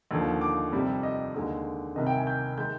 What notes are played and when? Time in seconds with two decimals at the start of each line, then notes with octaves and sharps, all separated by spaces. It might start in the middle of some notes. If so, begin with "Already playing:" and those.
0.11 D#2 D3 F3
0.41 D6
0.72 F2 C3 G3
1.03 D#5
1.34 D#2 D3 G#3
1.96 C2 C3 D#3 D#5
2.07 G5
2.16 G#5
2.27 G6
2.58 D#3 G#3 G6